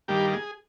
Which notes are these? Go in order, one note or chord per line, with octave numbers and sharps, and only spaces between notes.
G2 D#3 G3 A#3 G4
G#4